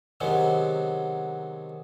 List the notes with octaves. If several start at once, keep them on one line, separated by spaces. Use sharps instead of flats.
C3 D#3 F#3 G#3 B3